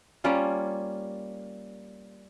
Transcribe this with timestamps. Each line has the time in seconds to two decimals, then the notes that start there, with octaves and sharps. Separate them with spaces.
0.24 G3 A#3 C#4 F4